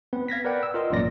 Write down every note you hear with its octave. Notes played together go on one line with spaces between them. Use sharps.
B3 C4 B4
F5 G#6 A#6 B6
A#4 B4 D5 F#5 G5
E6
F4 A#4 D#5 C6
A1 F#2 A#2 D5 A#6